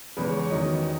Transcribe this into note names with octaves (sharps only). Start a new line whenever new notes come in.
E2 C#3 E3 G#3 B4
C#5
C#5
E2 D#3 F#3 D#5
D#5
D#5